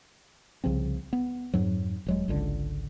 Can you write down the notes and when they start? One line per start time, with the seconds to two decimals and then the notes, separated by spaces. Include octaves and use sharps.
0.64 C2 C#3 F3 C4
1.13 B3
1.54 F2 G#2 F#3
2.06 D#1 F#3 G#3
2.28 G#1 C#2 D3